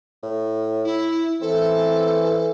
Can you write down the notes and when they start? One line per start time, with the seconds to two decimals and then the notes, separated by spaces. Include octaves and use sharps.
0.23 A2
0.85 E4
1.42 E3 C4 A4